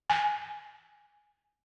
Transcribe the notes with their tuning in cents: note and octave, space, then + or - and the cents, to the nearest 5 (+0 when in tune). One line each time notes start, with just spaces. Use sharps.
G#5 +5